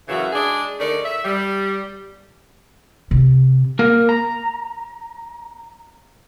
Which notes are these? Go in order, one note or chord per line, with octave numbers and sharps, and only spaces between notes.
F#2 C#3 E3 F#4 E5
G#3 D4 G#4
D3 A3 D#4 A#4 D5
E5
G3
C3
A#3 A#4
A#5